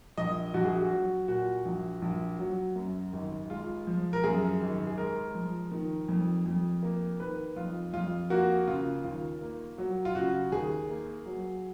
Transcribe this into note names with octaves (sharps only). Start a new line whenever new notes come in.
A#1 D#5
A#1 F#4
G#4
F#4
F#3
A#2 F#4
A#1
A#1
F#3
F#2
G#1
G#3 F4
F3
A#4
F#2 G#4
G#1
G#4
G#3 A#4
F3
D#3
F2
F2
A#3
D#3 B4
F2 F4
F2 F4
A#3 F#4
C#3 F4
D#2 F4
A#3
F#3
F4
C#3 F#4
D#2 G#4
A#3
F#3